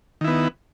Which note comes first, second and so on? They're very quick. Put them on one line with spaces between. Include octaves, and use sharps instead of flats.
D#3 E4 B3